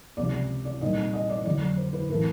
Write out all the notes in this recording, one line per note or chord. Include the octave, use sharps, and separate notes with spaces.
C#2 C3 F3 D5
D5
A#2 G3 C4 D#4 D#5
D#5
D5
F2 D3 F#3 D5
C5
B4
A2 E3 A3 C4 A#4